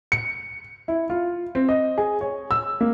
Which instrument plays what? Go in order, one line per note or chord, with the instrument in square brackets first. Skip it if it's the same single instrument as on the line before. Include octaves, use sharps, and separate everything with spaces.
[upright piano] C#7
E4
F4
C4
D#5
G#4
C#5
E6
A#3